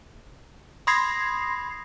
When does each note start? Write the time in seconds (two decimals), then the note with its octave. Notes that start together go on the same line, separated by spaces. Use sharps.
0.87 B5 C6 D#6 G#6 A#6 C7